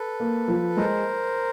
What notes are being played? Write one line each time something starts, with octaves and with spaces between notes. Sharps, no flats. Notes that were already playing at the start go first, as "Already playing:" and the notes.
Already playing: A4 B4
A#3
F3
G#3 A#4 C5